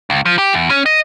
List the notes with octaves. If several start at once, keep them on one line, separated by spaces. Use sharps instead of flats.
C#2
F3
G4
E2
C#4
D#5